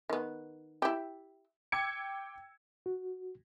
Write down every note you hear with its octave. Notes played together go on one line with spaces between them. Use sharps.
D#3 B3
E4 G4
G5 D6 E6 G#6 C#7
F#4